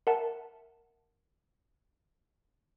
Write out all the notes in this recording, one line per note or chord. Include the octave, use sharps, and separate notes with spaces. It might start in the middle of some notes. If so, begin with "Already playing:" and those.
A#4 E5 F#5 A5